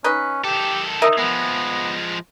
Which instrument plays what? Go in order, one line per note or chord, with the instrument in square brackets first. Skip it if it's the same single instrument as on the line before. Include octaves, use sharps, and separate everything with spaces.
[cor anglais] C#4 [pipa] D#4 B4
[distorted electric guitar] D#3 A4 [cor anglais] G4
[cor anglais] D#4 [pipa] A#4 D#5 E5
[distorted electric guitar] F3 G#3 [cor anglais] B3